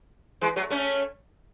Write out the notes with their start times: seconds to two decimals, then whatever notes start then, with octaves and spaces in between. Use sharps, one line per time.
0.41 E3 G#3
0.56 F#3 A3
0.70 A3 C#4